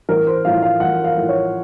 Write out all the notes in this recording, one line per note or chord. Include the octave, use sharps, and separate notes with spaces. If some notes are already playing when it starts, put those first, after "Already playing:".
A1 A#4
C5
A2 F3 A3 F5
F5
A1 F#5
F5
A2 F3 A3
C#5